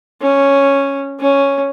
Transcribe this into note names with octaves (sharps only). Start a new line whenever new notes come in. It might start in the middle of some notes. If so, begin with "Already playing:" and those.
C#4
C#4